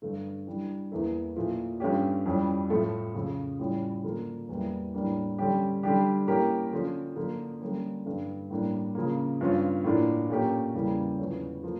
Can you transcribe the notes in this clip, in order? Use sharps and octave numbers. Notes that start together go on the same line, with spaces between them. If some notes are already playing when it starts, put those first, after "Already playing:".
G2 D3 A3
E3 G3 D4
E2 E3 A#3 E4 A4
A#2 F3 A3 E4
G2 F3 A3 C#4 G4
F2 E3 G3 C#4
A2 F3 A3 E4 A4
F2 C#3 F3 A3
A2 E3 G3 C#4 F4
D3 F3 A#3
E2 E3 G3 A#3 E4
A2 G3 A#3 D4
D3 G3 C#4 G4
D3 G3 D4 G4
E3 A#3 C#4 G4 A#4
D3 F3 C#4
D3 F3 A#3
D3 G3 A#3 C#4
G2 D3 G3
A2 G3 A#3 D4
C#3 F3 A#3
G2 F3 C#4 F4
A2 E3 A#3 D4 F4
A#2 A3 C#4 G4 A#4
E2 C#3 E3 G3 A#3
E2 D3 F3 A3 C#4
F3 A#3